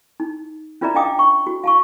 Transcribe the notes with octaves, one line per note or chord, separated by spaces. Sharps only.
D#4
C#4 F4 B4 D5 E5 A#5
D4 D#5 F5 G5 D6 D#6
C#6
F#4
F5 A5 C#6